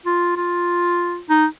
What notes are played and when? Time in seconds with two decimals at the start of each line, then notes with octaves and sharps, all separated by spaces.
0.06 F4
0.37 F4
1.30 D#4